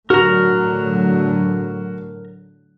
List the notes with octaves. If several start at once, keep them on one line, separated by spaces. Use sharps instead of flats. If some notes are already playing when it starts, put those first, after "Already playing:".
A2 D3 F#3 F#4 A#4 A#5